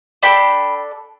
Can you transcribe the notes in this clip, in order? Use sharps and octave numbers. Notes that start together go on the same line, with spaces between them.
D4 A4 G5 B5